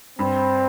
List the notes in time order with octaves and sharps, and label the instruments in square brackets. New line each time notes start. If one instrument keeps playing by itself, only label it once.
[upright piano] G2 [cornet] C4